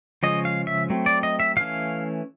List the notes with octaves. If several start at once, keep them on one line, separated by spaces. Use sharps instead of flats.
C#3 F3 G#3 C#4 D#5
F5
E5
F#3 A3 C4
D5
D#5
E5
E3 A3 C#4 F5